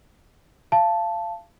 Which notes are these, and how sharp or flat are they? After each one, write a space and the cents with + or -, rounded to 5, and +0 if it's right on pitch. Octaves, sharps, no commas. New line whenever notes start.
F5 -25 A5 +0